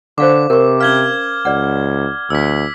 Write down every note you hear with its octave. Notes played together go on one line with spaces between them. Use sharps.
D3 C5 F5 C#6 D6
C3 A#4 C#6
C#4 F5 F6 G#6 G7
C#2 D5 F#5
D2 E6 B6